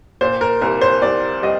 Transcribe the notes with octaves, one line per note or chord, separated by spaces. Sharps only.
A#2 C5
A#4
C2 A#4
C5
C2 D5
G3 D#5